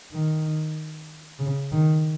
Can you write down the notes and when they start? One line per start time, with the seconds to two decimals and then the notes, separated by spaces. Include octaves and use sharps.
0.13 D#3
1.40 C#3
1.72 D#3